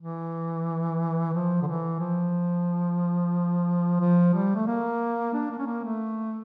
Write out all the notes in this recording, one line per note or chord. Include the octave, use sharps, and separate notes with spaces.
E3
F3
D3
E3
F3
F3
G3
A3
A#3
D4
A#3
C#4
A#3
A3